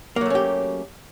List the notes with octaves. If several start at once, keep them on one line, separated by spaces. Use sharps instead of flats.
F#3 A3 A#3 C#4 G4